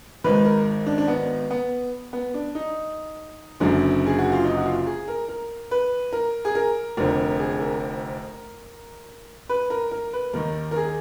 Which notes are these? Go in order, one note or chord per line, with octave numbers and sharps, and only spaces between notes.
G#1 G#2 D#3 B4
A#4
D4
D4
B3
B3
B3
D4
D#4
F#1 F#2 D3
G#4
F#4
F4
D#4
F#4
F4
G#4
A#4
A#4
B4
A#4
G#4
A#4
F1 F2 D3 A#4
A#4
G#4
A#4
B4
A#4
A#4
B4
D#2 D#3 A#4
A#4
G#4